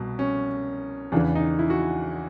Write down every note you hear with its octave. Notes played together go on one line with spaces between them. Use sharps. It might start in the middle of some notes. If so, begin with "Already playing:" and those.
Already playing: C2 B2
C#4
E2 C#3 E3 D4
D#4
E4
F#4